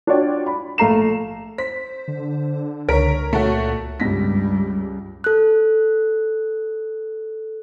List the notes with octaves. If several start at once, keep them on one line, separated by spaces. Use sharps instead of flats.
D4 F4 F#4 C#5 D5 G5
B5
A#1 A3 F5 A#5 C7 E7
C5 B6
D3
C#2 A#4 C#5 B6 D7
A#2 A3 F#4
C#2 G2 G3 A#6 B6
A4 F#6